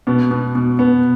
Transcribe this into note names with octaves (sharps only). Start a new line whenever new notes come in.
B2 B3
B2
B2
B2 B3